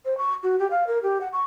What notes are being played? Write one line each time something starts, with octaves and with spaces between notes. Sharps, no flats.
C5
C#6
F#4
G4
F5
A#4
G4
F#5
C#6